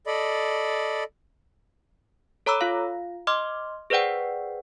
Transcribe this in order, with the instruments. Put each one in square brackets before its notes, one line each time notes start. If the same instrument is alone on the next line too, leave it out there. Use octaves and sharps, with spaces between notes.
[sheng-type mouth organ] A4 D5 D#5 B5
[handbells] A4 C#5 A#5 B5 D6 E6
F4 F5
D#5 C6 D6 F6
G#4 B4 C5 D5 F#5 G5